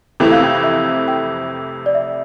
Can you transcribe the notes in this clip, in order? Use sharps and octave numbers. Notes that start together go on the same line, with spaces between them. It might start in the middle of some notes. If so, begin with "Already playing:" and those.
F2 C3 E3 A3 E4 G5
F5
G5
E5
G5
D5
E5